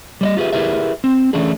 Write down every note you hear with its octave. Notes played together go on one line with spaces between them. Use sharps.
G3 D5 D#5
F4 G4 G#4 B4 E5
E4 G4 G#4 A#4 B4 E5
C4
E3 A3 C#4 D4 G#4